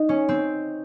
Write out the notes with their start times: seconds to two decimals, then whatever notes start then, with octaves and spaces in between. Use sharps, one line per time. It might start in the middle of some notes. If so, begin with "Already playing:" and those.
Already playing: D#4
0.09 C#4
0.29 C4